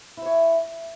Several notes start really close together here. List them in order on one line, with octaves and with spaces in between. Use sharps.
E4 C5 C#5